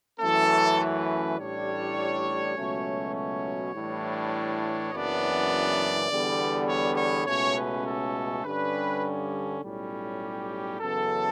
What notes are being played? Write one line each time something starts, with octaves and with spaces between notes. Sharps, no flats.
F#2 E3 A3 C#4 A4
B4
A1 A2 G3 D4 C#5
C#2 B2 F#3 A3 C#4
C#5
A2 E3 G3 D4
F#1 F#2 E3 B3 D4 D5
E2 D3 G3 B3
C#5
C#5
C#2 B2 A3 C#4 C#5
B4
A4
G2 D3 G3 C#4 B4
B1 A2 G3 C#4
G4
F#2 C#3 E3 B3 A4